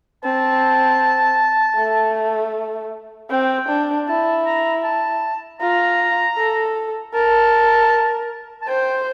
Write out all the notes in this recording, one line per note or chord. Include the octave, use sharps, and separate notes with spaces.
C4 A5
A3
C4 G5
D4
E4 A5
A#5
A5
F4 A#5
A4
A#4 A5
A5
C5 G5